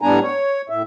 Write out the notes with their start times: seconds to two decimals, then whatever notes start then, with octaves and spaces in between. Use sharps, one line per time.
0.02 A2 G3 B3 D4 G#5 A#5
0.22 C#5
0.69 A2 E5